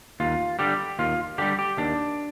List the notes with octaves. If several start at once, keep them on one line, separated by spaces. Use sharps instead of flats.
D#2 F4
D3 G3 G4
D#2 F4
D3 G3 G4
G4
D#2 D4